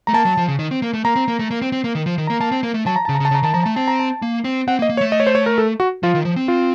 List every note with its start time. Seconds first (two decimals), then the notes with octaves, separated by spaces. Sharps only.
0.07 A3 A#5
0.14 A#3 A5
0.25 F#3
0.37 F3
0.48 C#3
0.59 D#3
0.71 C4
0.82 A#3
0.93 A3
1.05 A#3 A#5
1.16 C4
1.28 A#3
1.39 A3
1.51 A#3
1.62 C4
1.72 C4
1.84 A#3
1.95 D#3
2.06 F3
2.18 D#3
2.27 A#3 A#5
2.40 A#3 A5
2.52 C4
2.63 A#3
2.74 A3
2.86 F#3 A5
2.96 A#5
3.05 C#3 A5
3.15 A#5
3.20 C#3
3.25 A5
3.31 C#3
3.35 A#5
3.43 D#3 A5
3.54 F3 A#5
3.63 A3 A5
3.76 C4 A5
3.88 A#5
3.99 A5
4.22 A#3
4.44 C4
4.68 C4 F#5
4.79 A#3
4.82 D#5
4.90 A#3
4.97 C#5
5.01 A3
5.12 D#5
5.20 C#5
5.27 C5
5.35 C#5
5.46 A#4
5.58 A4
5.80 F#4
6.03 F3 F4
6.15 D#3
6.25 F3
6.36 C4
6.48 F4